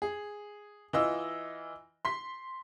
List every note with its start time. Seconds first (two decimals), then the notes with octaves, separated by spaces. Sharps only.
0.02 G#4
0.93 E3 F4 D#5 E6
2.05 C6 B6